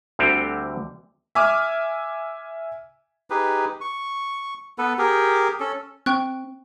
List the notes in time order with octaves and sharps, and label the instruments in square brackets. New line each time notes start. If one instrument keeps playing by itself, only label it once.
[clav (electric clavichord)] D2 D3 G3 C4 F#4 G4
[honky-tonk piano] E5 G#5 D6 F6
[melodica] D#4 G4 G#4 B4
C#6
B3 A4 B4
G4 G#4 A#4
C#4 A4
[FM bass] C4 [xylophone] G5 C#6 F#6